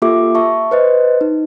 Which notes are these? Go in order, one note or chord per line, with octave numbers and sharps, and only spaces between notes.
A#3 F4 G4 A4 E5 D6
E5 A5 C#6
B4 C5 D#5
D#4